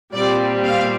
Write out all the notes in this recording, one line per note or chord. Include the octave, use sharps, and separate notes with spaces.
A#2 G3 C4 D5
F5